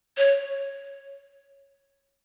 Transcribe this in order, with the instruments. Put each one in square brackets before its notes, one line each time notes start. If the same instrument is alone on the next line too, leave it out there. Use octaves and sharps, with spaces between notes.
[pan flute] C#5